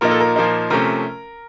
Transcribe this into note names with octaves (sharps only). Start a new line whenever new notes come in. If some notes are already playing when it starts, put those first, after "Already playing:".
A#2 F3 A#3 D#4 A#4
A4
A#4
A#2 F3 A#3 D#4
C3 F3 A3 C#4 A#4